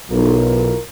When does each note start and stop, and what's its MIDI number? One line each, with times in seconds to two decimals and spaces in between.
0.10 0.70 35
0.10 0.79 64
0.10 0.79 65
0.10 0.79 70